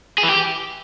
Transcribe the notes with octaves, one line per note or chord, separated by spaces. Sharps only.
G#4
E3
G4